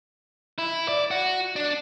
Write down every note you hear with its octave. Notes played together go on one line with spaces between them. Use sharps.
E4
D5
F#4
D4